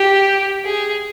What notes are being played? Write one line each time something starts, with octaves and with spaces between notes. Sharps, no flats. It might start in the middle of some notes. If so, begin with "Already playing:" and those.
Already playing: G4
G#4